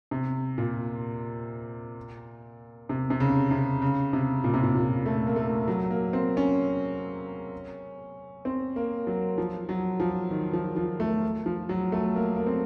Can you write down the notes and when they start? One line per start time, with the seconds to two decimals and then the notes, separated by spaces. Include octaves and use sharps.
0.11 C3
0.58 A#2
2.89 C3
3.10 C3
3.20 C#3
3.51 C3
3.82 C#3
4.13 C3
4.44 A#2
4.54 C3
4.63 A#2
4.75 A#2
5.06 A3
5.27 A#3
5.36 A3
5.68 F#3
5.91 A#3
6.13 C4
6.37 C#4
8.45 C4
8.76 A#3
9.07 F#3
9.38 F3
9.69 F#3
10.00 F3
10.31 D#3
10.53 F3
10.76 F3
11.00 A3
11.46 F3
11.69 F#3
11.92 A3
12.16 A#3
12.36 A#3
12.46 C4